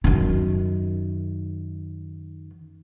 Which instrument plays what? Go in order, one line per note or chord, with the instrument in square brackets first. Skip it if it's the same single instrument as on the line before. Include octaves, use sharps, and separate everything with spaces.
[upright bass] F#2 D#3